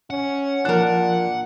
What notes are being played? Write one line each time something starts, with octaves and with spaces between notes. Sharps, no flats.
C#4 F#5
A#2 F3 D4 A#4 F#6